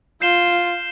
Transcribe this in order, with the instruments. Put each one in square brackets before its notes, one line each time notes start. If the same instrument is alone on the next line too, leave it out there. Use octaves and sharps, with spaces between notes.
[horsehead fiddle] F4 [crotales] G6 C7 E7 G7